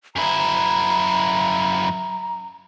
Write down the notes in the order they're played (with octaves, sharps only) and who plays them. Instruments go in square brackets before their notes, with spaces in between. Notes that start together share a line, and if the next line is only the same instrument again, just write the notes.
[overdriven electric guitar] F#2 E4 [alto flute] A#5